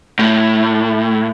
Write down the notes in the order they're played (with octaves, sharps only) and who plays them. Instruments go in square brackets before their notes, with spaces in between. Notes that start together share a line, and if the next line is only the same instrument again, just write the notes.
[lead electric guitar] A2